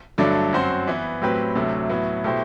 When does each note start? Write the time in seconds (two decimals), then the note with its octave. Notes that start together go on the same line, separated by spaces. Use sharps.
0.18 G2 D3 F#3 A3 D4
0.53 F#2 F#3 C4 F#4 C5
0.87 E3 B3 E4
1.22 A2 F#3 C4 G4 B4
1.56 D2 C3 F#3 A3
1.89 A2 F#3 B3 E4
2.24 B2 A3 E4 G4 C5